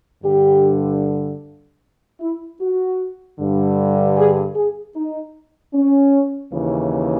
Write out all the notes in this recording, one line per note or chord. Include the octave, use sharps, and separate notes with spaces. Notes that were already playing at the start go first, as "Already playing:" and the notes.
G2 D3 G4
E4
F#4
G2 D3
G#4
G#4
D#4
C#4
D#2 C#3 E3